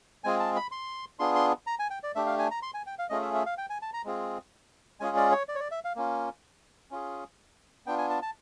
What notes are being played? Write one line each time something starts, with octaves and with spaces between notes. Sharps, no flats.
G#3 C4 F4 G#4 G#5
A5
B5
C6
B3 D4 F4 G#4 C6
C6
A#5
G#5
G5
D5
A3 D4 G4 E5
F5
G#5
A#5
C6
G#5
G5
F5
A3 C#4 F4 G#4 D#5
E5
E5
F5
G5
G#5
A5
A#5
G#3 C4 F4 G#4
G#3 C#4 F4 G#4 G#5
D5
C#5
D5
C#5
D5
E5
F5
A#3 C#4 F4
C#4 F4 G#4
B3 D4 F4 G5
G#5
A5
A5